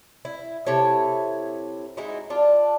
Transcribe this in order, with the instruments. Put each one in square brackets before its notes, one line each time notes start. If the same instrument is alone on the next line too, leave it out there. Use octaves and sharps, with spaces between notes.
[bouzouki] E4
C3 E4 A4 C#5
G#3 D#4 E4 F#4
D4 F4